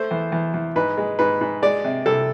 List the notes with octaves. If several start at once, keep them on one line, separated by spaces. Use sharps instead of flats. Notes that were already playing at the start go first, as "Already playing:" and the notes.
Already playing: A3 C5
E2
E2
E2
G#2 B4
G#3
G#2 B4
G#2
G#3 D5
C3
C2 A4